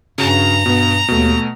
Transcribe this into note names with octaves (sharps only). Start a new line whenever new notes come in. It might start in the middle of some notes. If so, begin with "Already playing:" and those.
G2 C#3 F#4 A#5
G2 B2 B3
D#2 B2 A3